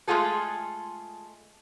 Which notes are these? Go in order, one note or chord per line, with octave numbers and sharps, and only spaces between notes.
G#3 A3 F4 G#4 A4